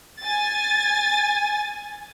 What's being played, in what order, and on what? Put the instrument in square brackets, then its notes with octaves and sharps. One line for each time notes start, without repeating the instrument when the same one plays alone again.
[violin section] G#5 A6